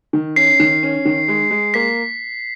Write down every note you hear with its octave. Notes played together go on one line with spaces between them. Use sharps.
D#3
C#4 C7
D#3
C#4
D#3
G#3
G#3
A#3 B6